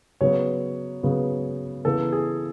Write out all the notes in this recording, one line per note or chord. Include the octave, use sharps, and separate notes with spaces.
C#3 F#3 B3 C#5
C#3 F#3 B3
C#3 E3 B3 A4
G#4